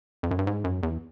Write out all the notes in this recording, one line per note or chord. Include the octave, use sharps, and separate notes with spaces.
F2
F#2
G2
G#2
F#2
E2